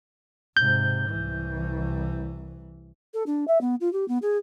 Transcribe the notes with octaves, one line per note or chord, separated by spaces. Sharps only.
G#2 C3 G6
C2 E3
A4
D4
E5
B3
F4
G4
B3
G#4